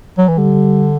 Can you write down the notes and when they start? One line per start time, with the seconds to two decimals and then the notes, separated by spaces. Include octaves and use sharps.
0.18 F#3
0.28 E3
0.37 D3 G3